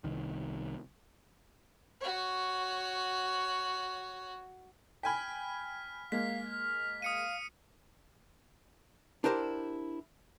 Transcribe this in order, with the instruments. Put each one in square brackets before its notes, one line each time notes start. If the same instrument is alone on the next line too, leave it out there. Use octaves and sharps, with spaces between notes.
[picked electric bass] C2 D#3
[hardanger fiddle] F#4 C#5
[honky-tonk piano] G5 G#5 B5 [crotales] F6 B6
[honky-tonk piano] G#3 A#3 [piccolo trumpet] F5 [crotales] B6
[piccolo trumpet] F6
[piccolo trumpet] F5 [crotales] D#6 C#7 D#7
[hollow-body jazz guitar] D4 E4 G4 A#4 C5